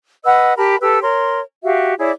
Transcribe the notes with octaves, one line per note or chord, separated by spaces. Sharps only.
B4 D#5 F#5 E6
G4 A#4 A5 B5
G4 A4 B4 E6
A#4 C#5 C6
F#4 G4 E5 F5
E4 G#4 C#5 D5